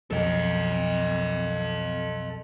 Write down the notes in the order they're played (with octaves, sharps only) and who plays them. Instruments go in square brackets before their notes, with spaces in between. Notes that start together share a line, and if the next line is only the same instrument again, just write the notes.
[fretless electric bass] B1 F2 [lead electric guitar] A4 D#5